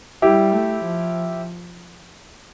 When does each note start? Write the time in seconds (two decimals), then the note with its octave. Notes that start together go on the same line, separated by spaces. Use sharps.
0.22 G3 E4 G4
0.52 A3
0.83 F3